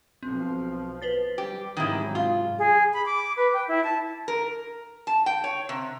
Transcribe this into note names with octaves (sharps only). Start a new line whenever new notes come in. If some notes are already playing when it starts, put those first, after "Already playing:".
B1 F3 C4
B4 C5 A6
G3 G4
G#2 C3 D#3 F#3 E4 D#6
F4
G#4
B5
D6
B4
G5
E4
A5
A#4
A5
G5
C#5
C3